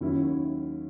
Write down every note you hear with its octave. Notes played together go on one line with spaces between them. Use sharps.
D#2 D#3 F#3 C#4 E4